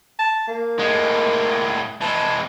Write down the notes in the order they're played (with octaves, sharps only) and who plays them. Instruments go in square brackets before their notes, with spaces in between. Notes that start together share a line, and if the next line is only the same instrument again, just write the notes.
[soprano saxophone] A5
A#3
[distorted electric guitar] A2 G#3
[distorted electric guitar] E3 G#3 [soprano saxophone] A5